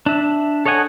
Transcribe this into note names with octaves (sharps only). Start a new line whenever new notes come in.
D4 E5
A4 C#5 D#5 F#5 G#5